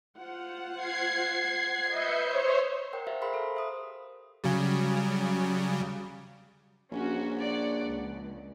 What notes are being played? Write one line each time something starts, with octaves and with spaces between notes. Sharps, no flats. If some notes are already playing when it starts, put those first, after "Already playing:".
F4 C5 F#5
G#6 C7
B4 D#5 E5 G6 C#7
C5 C#5
A#4 C5 F#5 G5
G4 C5 E5 F5
G4 G#4 A#4 C5 B5 C6
A4 F5
C5 E5 D#6
C#3 F#3 G3
A#1 C#4 F#4
C#5 D5 F#5
C#2